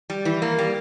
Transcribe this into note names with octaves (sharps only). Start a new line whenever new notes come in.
G3
E3
A#3
G3